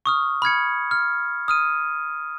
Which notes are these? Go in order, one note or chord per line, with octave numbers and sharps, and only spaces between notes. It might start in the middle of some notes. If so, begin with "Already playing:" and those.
C#6 D#6 F6
B5 F6 G#6 C#7
F6
D#6 F6 D#7